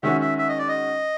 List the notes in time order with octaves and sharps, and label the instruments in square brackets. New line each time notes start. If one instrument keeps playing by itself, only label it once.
[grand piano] D#3 G#3 C#4 F#4 [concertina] E5
[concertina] E5
E5
D#5
D5
D#5